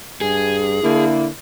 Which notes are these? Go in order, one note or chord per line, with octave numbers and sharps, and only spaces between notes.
G2 G#4
D3 A#3 E4